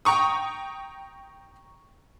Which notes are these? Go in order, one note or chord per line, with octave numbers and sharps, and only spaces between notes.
G5 A#5 C#6 D#6